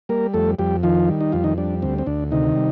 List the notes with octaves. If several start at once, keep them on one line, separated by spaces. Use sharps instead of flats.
G3 A#3 A#4
F2 A3 A4
F2 G3 G4
D#3 F3 F4
G3
D#4
F2 F4
D#3 D#4
G3 D4
D2 C4
C4
D2 D4
C3 D#3 D#4
G3